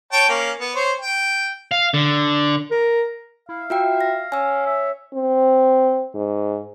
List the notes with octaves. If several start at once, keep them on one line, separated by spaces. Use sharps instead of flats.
C#5 G5 A5
A#3 C#4
B3
C5 C#5
G5
F5
D3
A#4
E4 F5
F4 F#4 E5 G5
A#6
C#4 G#5 E6
E5
C4
G#2